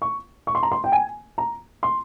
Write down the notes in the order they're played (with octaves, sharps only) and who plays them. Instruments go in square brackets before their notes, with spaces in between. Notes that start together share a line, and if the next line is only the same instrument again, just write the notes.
[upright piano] C#6
C#6
C6
A#5
C6
G5
G#5
A#5
C6